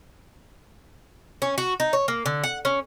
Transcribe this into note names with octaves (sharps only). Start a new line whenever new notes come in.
C#4
F#4
D#4
C#5
A#3
D3
F#5
C#4